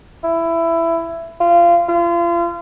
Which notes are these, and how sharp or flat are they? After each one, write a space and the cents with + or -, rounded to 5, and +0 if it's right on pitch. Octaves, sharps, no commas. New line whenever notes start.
E4 +15
F4 -25
F4 -35